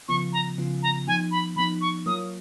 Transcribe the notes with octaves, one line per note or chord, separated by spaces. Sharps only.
C#3 F3 B3 F4 C#6
A#5
C#3 F3 B3 F4
A#5
F3 B3 D#4 G#5
B5
F3 B3 D#4 B5
C#6
F#3 A#3 F4 A#4 C#5 D#6